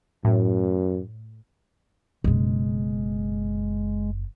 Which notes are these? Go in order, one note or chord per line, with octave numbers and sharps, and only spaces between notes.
F#2 A2
F#1 B2 G#3